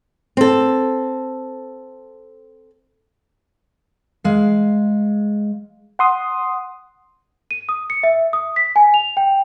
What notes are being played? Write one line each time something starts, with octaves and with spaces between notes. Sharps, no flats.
C4 A4
G#3 F5
F#5 C6 D#6
D#7
D#6
C#7
E5
D#6
B6
G#5
F7
G5